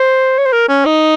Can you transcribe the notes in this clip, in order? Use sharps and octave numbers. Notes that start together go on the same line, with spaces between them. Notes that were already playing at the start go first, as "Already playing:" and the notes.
Already playing: C5
C#5
C5
A#4
C#4
D#4